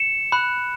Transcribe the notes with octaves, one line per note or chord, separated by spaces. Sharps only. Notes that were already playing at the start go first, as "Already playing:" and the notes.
Already playing: C#7 E7
B5 F#6